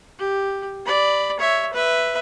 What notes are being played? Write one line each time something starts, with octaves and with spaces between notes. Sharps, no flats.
G4
D5 B5
C#5 E5
B4 E5